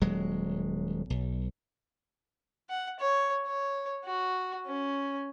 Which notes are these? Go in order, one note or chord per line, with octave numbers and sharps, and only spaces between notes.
D#1 F#3 G#3
B1
F#5
C#5
C#5
F#4
C#4